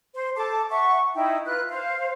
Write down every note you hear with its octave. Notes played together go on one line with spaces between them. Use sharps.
C5
A4 A5 D6
E5 F#5 C#6
D#4 E4 G5
F4 B4 F#6
C5 F5